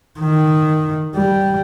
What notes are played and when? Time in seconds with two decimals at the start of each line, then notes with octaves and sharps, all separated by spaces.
0.19 D#3
1.15 G3